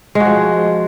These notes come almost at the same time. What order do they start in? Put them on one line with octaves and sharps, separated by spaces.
G#3 F#4 F3